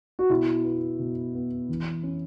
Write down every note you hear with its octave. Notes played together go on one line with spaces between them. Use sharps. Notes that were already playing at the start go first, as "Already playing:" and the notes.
F#4
B2 E4
B3
B2
B3
E3
C#4